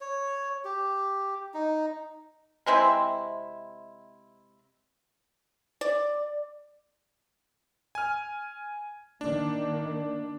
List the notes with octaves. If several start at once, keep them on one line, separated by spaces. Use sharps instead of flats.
C#5
G4
D#4
C3 G#3 C4 E4
D5
G#5 F6
D#3 A#3 D4